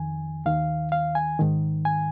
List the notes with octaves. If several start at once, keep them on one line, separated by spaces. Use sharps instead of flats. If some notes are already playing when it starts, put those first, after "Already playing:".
Already playing: F2 D#3 G#5
D#2 D#3 F5
F5
G#5
G#2 D#3
G#5